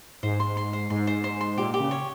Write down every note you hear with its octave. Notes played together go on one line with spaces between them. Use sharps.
G#2 C5
C6
C6
C5
G#2 C6
C5
C5
C6
A#2 G4
G4
C#3
C#5